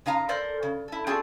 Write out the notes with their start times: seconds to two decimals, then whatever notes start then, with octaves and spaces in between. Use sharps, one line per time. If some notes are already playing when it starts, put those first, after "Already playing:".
0.06 C#3 D#4 F5 A#5
0.29 A4 A#4 C5 D5
0.63 C#3
0.88 E4 A4
1.07 C4 D4 F4 F#4 G#4 A4